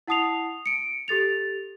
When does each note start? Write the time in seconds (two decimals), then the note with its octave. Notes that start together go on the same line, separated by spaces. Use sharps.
0.08 E4 F#5 A5 D#6 C7 F7
0.66 C#7 D7
1.08 G4 A4 A6 F7